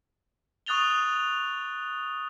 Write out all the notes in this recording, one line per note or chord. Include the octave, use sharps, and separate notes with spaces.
C#6 D#6 F#6 A6 F7 G7